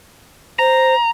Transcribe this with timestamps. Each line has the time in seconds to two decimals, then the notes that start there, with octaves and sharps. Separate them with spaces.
0.59 C5 A#5